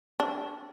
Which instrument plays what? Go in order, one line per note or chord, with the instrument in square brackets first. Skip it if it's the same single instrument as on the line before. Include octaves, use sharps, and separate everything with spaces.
[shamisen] D4